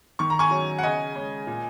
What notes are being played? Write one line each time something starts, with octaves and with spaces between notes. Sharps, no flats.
D#3 C#6
A#5
G#5 C#6
F#3 C#4
F#5
C#3 D#5 G#5
G#3 C#4
A#2